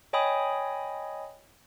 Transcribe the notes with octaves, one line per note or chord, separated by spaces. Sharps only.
C#5 D#5 G5 G#5 B5 D#6